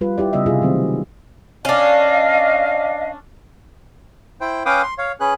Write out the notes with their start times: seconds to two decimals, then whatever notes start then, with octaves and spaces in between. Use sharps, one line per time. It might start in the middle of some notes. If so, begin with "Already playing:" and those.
0.01 G3 F4 B4
0.18 E4 G4 D5
0.33 C#3 G3 B3 D#5 E5
0.46 C3 E4 F4 G#4
0.62 D#3 F#3 A3 C4
1.65 C#4 D4 D#5 F5
4.41 E4 C5 G5
4.66 C#4 B4 F5 G5 D6 D#6
4.83 C6
4.98 C#5 F5
5.20 C#4 G#4 B4 F#6